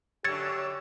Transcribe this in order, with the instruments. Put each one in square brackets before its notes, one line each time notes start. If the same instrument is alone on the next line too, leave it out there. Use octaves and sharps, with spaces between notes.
[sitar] F#2 D3 [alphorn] G4 [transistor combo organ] C#5 E6 [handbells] G#6 A6 C#7